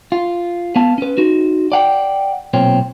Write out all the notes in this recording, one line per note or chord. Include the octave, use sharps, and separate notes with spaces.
F4
B3 F5 A5
C#4 B4
D#4 F#4
D5 F#5 G5
B1 A#2 C4 C#5